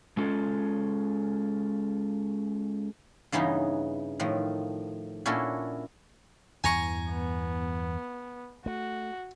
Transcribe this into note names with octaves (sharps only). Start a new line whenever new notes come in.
G#3 C#4 F4 A4
G2 C#3 E3 B3 D#4
A2 D#3 F3
A#2 C#4 D4 E4 F#4 A4
E2 G2 E3 G#5 A#5 C#6
B3
A3 F#4